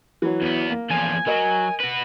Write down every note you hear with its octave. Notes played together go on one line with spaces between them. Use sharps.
E3 F#3
E2 B3
A#3
E2 F3 G#5
F#3 A#4 D#5
F#4 B4